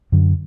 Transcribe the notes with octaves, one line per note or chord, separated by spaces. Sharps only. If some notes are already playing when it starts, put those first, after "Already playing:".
F#2 D3 F#3